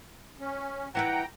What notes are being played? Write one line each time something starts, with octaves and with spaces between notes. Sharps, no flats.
C#4
E3 E4 B4 F#5 G5 A#5